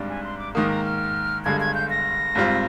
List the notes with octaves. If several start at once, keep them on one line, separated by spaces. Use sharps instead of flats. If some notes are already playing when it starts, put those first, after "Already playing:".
Already playing: G#1 G#2 G3 D4
G#5
C6
D6
G#2 D#3 A#3 D#6
A#5
F6
G1 G2 D3 G#3 G#6
G#6
G6
A#6
G#1 G#2 G3 C4 F4